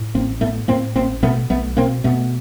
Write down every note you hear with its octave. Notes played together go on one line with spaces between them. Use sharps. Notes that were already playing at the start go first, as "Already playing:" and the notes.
Already playing: A2
A1 A#3 C4
A2 A3 B3
A2 A#3 C4
A1 A#3 C4
B2 A3 B3
B1 A3 B3
B2 A#3 C4
B2 A3 B3